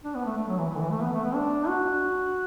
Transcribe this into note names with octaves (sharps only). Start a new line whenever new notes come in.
D4
B3
A3
A3
F#3
E3
E3
D3
E3
A3
B3
A3
B3
D4
F#4